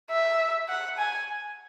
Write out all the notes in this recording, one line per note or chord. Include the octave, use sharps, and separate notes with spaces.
E5
F#5
G#5